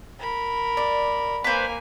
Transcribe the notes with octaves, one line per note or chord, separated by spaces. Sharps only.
A#4 B5
D5
A#3 B4 C5 G#5